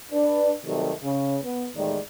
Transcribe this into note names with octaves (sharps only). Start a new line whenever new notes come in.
D4 B4 D5
C3 D#3 F#3 G3 A3
C#3
B3
E2 A2 D#3 G3 G#3 D5